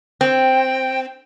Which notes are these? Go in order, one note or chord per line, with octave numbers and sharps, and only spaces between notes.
C4 G5